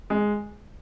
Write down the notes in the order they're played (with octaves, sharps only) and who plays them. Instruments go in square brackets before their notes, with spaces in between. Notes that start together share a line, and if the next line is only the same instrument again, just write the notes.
[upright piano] G#3